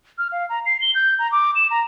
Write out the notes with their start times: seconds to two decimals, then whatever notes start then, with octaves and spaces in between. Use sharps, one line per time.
0.18 F6
0.32 F5
0.49 A#5
0.66 C7
0.81 G7
0.95 G6
1.19 A#5
1.32 D6
1.55 E7
1.71 A#5